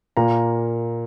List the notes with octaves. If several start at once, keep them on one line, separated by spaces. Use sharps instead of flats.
A#2 A#3 A#5